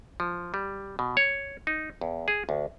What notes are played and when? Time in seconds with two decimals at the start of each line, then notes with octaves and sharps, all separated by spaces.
0.20 F3
0.54 G3
0.99 B2
1.17 C#5
1.67 D#4
2.01 E2
2.28 G#4
2.49 D2